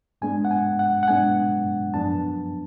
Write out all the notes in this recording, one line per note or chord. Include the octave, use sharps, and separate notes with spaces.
G#2 G#3 B3 D4 G#5
F#5
G#5
F#5
F#5
G#2 G#3 B3 D4 G#5
F#2 F3 B3 D4 A5